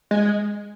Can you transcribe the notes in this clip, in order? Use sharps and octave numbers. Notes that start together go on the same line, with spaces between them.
G#3